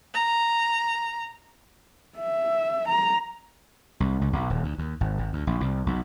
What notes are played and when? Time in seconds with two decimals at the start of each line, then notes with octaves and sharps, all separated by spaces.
0.14 A#5
2.18 E5
2.88 A#5
4.00 C2
4.21 C#2
4.33 B1
4.50 D#1
4.63 D2
4.78 D#2
5.01 G#1
5.18 G#1
5.33 D2
5.47 A#1
5.61 C2
5.86 B1